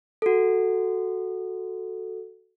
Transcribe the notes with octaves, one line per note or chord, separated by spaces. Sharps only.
F#4 A4